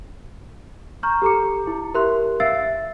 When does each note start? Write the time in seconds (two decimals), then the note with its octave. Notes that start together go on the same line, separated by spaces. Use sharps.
1.03 A#5 C#6 F6 G6
1.22 G4 A4 A#5 D6 C#7
1.67 E4
1.94 E4 G4 A#4 E5 C6 F#6
2.40 E5 F5 E6 A6 C7 D7
2.64 E5